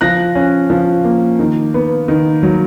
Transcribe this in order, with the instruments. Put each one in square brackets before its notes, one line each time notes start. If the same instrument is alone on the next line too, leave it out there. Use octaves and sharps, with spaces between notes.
[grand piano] F3 F#6 A#6
C#4
F3
A#3
D#3
B3
D#3
F#3